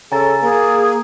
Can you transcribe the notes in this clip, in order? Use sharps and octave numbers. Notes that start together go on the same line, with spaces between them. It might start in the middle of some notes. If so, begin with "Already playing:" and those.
C#3 A4 G#5 A#5 A6
A#3 G#4